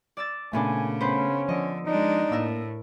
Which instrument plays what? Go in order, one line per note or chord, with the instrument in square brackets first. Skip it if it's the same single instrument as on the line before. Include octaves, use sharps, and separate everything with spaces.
[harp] D5 E6 A6
[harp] A#2 B3 D4 [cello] C#3 [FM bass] A3 [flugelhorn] G#5
[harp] B3 B4 C5 [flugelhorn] C#4
[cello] D3 [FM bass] F3 [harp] D#5
[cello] G#3 D4 [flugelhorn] D#4
[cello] A2 [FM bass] A#3 [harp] A#4 E6